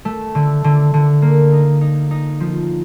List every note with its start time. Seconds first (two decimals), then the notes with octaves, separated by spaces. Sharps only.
0.05 A3
0.35 D3
0.64 D3
0.94 D3
1.22 A#3
1.52 D#4
1.81 D#4
2.11 D#4
2.40 F3